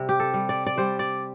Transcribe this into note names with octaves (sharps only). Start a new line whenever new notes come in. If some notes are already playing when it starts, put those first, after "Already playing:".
Already playing: C3 G3
G4
A4
G3
D5
D5
G3 C5
D5